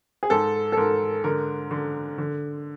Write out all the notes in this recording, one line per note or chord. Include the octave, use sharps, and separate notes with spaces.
G#4
G#2 A4
A4
G#2 A#4
D3 A#4
D3
D3